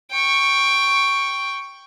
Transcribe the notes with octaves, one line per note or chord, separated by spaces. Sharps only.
G5 C#6